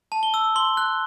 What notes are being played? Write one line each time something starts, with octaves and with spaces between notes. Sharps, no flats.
A5
G7
E6
C6 G7
F#6